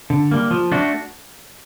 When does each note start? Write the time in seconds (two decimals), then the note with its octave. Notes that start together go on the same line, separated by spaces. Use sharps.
0.10 D3
0.31 G3 A#3
0.51 F3
0.72 A3 D4 F#4